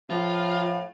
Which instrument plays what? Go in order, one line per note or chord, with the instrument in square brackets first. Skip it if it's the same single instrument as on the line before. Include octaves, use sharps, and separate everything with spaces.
[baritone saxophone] A2 [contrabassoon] F3 [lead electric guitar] F4 [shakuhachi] F5